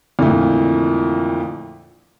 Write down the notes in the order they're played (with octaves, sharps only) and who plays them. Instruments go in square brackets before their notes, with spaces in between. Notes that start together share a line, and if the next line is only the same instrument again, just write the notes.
[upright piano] F2 A#2 D3 E3 A3